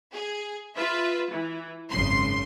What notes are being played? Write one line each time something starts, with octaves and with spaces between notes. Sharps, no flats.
G#4
F4 B4 E5
E3
G#1 F#2 C#3 C6